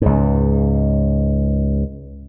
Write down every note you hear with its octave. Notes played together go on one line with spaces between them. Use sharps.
C#2 G#2